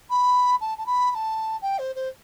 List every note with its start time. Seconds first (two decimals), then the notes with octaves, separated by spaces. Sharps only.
0.10 B5
0.61 A5
0.78 A5
0.86 B5
1.11 B5
1.15 A5
1.62 G5
1.79 C5
1.96 C5